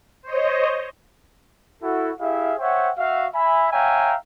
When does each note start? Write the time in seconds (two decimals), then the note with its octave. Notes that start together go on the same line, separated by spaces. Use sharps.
0.22 C5 C#5 D#5
1.82 E4 F#4 A4
2.20 E4 G4 G#4 E5 F5
2.59 C5 C#5 E5 F#5 G5
2.98 F#4 E5 F5
3.34 E5 G#5 B5
3.72 C#5 E5 F5 G5 G#5 A#5